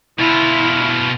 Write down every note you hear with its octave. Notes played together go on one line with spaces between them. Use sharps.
B2 E4 F4